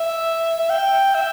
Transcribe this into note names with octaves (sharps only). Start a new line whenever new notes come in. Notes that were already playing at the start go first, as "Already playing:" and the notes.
Already playing: E5
E5
G5
E5